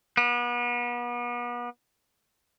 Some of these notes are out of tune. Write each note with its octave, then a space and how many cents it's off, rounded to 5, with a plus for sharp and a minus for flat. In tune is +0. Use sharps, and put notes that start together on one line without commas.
B3 -35